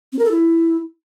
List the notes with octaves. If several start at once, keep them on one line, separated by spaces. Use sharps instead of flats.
C4
A#4
A4
E4